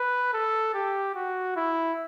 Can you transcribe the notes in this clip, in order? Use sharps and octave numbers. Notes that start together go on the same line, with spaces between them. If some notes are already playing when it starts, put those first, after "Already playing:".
Already playing: B4
A4
G4
F#4
E4